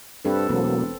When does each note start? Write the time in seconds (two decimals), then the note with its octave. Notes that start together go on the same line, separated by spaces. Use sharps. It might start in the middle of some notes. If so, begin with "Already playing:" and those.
0.25 G2 C4 A4 B4
0.49 E1 B2 F#3 A#3 C4 A4